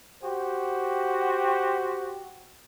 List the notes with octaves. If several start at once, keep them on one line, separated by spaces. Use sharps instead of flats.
F#4 G4 C5